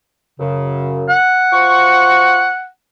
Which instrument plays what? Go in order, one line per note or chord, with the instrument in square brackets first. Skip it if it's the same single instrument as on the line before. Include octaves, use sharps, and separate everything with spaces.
[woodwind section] F#2 C#3
[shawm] F#5
[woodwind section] F4 C5 C#6